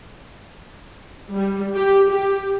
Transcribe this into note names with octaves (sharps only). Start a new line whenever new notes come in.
G3
G4
G4